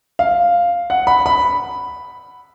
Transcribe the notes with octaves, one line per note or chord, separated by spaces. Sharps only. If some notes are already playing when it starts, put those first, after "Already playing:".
F5
F#5
B5
B5